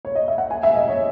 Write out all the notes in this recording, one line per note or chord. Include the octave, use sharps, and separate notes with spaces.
C#5
D#5
E5
F#5
G#5
E5
D#5
C#5